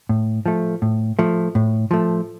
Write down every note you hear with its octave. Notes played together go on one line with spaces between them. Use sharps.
A2
F3 A3
A2
F3 A3
A2
F3 A3